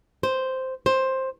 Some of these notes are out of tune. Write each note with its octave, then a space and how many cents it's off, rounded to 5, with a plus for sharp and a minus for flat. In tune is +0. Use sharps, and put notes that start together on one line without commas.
C5 -5
C5 +10